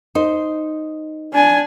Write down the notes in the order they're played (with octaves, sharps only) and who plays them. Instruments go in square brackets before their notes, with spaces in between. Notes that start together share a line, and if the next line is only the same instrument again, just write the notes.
[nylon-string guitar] D#4 C5
[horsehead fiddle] D4 G#5